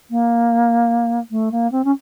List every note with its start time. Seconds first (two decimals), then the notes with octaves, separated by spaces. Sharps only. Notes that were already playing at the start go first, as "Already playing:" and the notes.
0.10 A#3
1.31 A3
1.52 A#3
1.72 C4
1.84 C#4